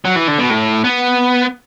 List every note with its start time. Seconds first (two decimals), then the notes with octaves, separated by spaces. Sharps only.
0.05 F#3
0.16 E3
0.28 D3
0.39 B2
0.50 A2
0.84 B3